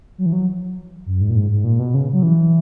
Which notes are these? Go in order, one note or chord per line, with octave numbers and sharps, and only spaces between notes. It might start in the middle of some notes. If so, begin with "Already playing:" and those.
F#3
E3
F#3
F#2
G#2
A#2
G#2
G#2
A#2
B2
C#3
F#3
E3